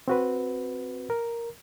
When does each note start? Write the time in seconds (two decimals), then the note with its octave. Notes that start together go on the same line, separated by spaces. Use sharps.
0.08 C4 F#4 B4
1.10 A#4